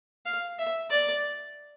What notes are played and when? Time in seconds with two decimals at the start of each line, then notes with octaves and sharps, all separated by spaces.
0.26 F5
0.59 E5
0.91 D5